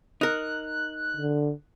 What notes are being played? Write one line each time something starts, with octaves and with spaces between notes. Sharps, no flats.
D#4 A#4 F#6
D3